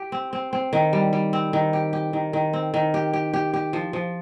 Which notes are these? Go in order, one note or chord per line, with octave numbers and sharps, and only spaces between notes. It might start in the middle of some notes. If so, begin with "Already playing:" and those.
Already playing: G4
C4
C4
C4
D#3
G3
G3
C4
D#3
G4
G4
D#3
D#3
C4
D#3
G4
G4
G4
G4
F3
F3